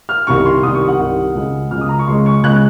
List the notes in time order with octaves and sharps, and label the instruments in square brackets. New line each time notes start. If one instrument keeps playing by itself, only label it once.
[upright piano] F6
C2 C3 D#3 C#6
C6
C2 C3 D#3 D#6
C#6
F#5
C2 C3 D#3
C#2 C#3 G#3
C#2 C#3 G#3 F6
D#6
A#5
C#6
C#2 C#3 G#3 C6
C#6
C#2 C#3 G#3 F#6